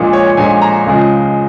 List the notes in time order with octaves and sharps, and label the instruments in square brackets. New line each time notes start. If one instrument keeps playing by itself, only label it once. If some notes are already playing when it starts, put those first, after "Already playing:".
Already playing: [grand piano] A#1 A#2 G#3
C#5
A#1 A#2 G#3 G#5
A#5
C#2 C#3 F3 G#3